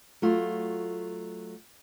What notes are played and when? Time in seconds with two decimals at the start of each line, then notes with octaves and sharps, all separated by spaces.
0.22 F#3 A3 F4